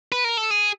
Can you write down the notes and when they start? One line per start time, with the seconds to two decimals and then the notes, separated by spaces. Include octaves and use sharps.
0.12 B4
0.24 A#4
0.37 A4
0.51 G#4